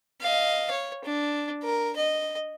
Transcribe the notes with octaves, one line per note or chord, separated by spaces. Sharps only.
D#5 F5
C#5
D4
A#4
D#5